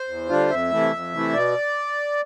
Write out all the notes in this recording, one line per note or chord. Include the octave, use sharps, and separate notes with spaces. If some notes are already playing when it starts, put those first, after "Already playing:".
Already playing: C5
E2
D3 G3 D4 F4
F2 E5
C3 E3 A3 E4
F2
C3 E3 A3 E4
B2 D5